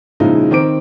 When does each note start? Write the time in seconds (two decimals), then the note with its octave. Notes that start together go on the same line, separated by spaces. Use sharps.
0.20 A#2 C#3 F3 G#3 D#4 E4
0.51 D#3 C4 D6 D7